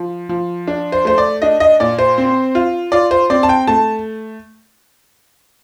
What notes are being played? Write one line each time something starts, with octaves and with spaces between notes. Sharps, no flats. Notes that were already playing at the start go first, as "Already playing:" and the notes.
Already playing: F3
F3
D4
C5
A3 C5
D5
D4 D#5
D#5
A#2 D5
C5
C4
F4
F4 D5
C5
C4 D5
A5
G5
A3 A5